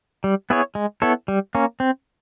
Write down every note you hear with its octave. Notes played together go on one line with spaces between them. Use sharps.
G3
B3 E4 G#4 C#5
G#3
B3 E4 A4 C#5
G3
A#3 C#4
C4